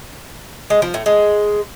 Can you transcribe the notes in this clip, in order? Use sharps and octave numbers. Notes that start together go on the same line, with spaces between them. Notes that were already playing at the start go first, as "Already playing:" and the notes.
G#3
F3
A2
G#3